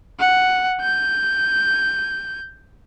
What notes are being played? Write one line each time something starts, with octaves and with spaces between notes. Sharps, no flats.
F#5
G6